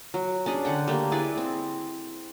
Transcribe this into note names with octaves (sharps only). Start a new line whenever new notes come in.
F#3
C#4 D4 G#4
D3 F#5 G5
G3 A3 A#3
E4 G#4 B4 D5
C4